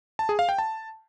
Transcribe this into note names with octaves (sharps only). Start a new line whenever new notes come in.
A5
G#4
F5
G5
A5